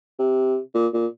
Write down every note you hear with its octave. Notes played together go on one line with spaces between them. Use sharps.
C3
A#2
A#2